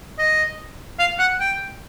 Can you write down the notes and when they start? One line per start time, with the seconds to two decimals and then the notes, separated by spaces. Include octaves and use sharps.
0.18 D#5
0.99 F5
1.19 F#5
1.40 G5